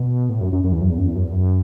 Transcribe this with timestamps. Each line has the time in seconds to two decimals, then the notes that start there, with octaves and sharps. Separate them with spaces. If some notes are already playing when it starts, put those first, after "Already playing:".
Already playing: B2
0.29 A2
0.41 F#2
0.53 F#2
0.64 F#2
0.72 E2
0.81 F#2
0.90 E2
0.98 F#2
1.07 E2
1.16 F#2
1.24 E2
1.33 F#2